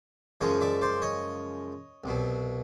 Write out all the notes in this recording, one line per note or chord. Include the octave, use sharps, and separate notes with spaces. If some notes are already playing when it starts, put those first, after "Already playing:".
F#2 C#3 F3 G#3 C#5 D#5
D5 E5
C5 D5
C#5 D#5
C2 B2 F#3